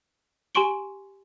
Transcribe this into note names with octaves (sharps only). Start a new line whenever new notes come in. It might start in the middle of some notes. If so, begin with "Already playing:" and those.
G4 G#5 C6 C#6 D7 G7